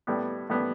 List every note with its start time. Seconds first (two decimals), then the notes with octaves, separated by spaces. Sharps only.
0.07 A2 G3 B3
0.49 A2 G3 B3